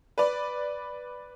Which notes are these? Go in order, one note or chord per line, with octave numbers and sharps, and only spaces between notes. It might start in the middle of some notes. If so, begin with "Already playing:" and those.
B4 D5